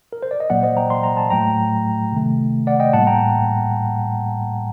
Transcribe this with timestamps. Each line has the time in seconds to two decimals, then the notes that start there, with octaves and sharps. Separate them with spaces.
0.13 A#4
0.23 C5
0.31 D5
0.40 D#5
0.50 A#2 F#3 A#3 D5 F#5
0.63 C5 D#5
0.77 G5 A#5
0.90 C6
1.04 A#5
1.17 A5
1.30 A2 F#3 A3 G5 A#5
2.12 C3 D#3 A3
2.67 D5 F#5
2.80 D#5 G5
2.93 A2 G3 A#3 F#5 A5
3.07 G5 A#5